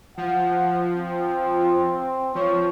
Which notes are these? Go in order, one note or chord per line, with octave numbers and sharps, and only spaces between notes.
F3 F#5
C4
F3 C#5